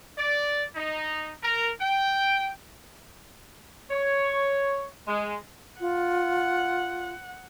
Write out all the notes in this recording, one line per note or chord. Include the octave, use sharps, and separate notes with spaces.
D5
D#4
A#4
G5
C#5
G#3
F4 F#5